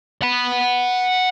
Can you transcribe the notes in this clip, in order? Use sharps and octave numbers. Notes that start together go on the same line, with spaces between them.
F#5 B5